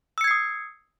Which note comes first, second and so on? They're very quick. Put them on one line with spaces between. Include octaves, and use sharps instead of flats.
E6 C#7 G#6 C7 D#6